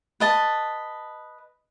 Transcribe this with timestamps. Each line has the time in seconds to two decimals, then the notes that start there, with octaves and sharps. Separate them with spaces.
0.20 B4 D#5 A5